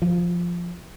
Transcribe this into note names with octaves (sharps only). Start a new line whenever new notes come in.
F3